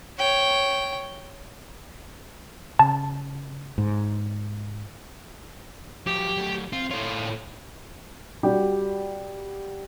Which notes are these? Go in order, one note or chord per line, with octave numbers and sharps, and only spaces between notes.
C#5 G5
C#3 A5
G#2
F3 F#3 G4
F#3 A3
C4 F4
A2 F4 A4 C#5
G3 F#4 G4